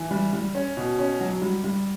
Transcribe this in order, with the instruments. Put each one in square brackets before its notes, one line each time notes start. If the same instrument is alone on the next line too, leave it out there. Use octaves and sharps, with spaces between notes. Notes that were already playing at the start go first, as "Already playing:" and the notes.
Already playing: [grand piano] E3
G3
G3
C#4
B2
C#4
F#3
G3
G3